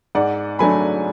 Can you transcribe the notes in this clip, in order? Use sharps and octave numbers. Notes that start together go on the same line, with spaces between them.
G#2 D5 F#5
F#3 A3 D4 G#5 B5